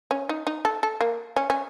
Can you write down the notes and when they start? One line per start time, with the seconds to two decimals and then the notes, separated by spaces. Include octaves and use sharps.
0.11 C#4
0.29 D#4
0.47 D#4
0.65 A4
0.83 A4
1.01 A#3
1.36 C#4
1.50 C#4